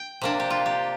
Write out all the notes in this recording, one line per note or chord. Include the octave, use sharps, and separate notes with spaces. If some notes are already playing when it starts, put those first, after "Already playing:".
Already playing: G5
C3 A#3 D4
G4
F4
G4